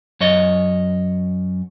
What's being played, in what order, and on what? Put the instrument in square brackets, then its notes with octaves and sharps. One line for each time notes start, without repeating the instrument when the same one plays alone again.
[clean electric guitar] F#2 C#5 D#5